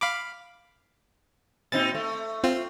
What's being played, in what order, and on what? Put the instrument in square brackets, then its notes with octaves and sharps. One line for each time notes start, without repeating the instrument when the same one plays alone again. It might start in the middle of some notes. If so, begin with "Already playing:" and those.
[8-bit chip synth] F5 B5 D6
[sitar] A#2 C4 D#4 [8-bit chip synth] A6
[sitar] A3
[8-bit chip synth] C4 F4